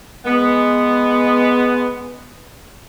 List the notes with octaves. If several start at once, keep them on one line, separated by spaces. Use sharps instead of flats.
G#3 B3